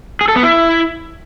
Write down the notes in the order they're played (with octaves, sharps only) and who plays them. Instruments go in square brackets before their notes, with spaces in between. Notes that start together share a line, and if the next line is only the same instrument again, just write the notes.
[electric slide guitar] G#4
A4
B3
E4